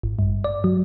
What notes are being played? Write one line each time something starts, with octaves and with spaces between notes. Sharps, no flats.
G#1
G2
D5
F#3